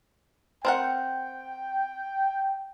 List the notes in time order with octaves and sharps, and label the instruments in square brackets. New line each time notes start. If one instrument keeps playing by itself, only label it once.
[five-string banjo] C4 A#4 F#5 [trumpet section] G5